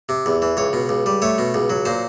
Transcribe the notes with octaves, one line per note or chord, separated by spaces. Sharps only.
C3
E2
E3
C#2 C#5
B2
C#2
G3
A3 C#5
B2
C#2
F#3
A#2 C5